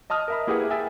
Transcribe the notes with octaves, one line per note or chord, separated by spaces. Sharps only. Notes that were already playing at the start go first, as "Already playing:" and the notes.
D#5 A5 D#6 F6
A#4 E5 B5
A#3 E4 G4 G#4 B4 F#5
E5 G5 G#5 E6 A6